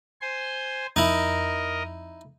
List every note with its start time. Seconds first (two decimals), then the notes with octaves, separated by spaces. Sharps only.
0.21 C5 G#5 C6
0.96 F2 D#4 E4 A#4 D#5